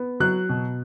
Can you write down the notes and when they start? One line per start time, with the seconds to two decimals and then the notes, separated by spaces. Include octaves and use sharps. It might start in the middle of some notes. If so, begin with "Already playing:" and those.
Already playing: B3
0.20 F#3 F#6
0.49 B2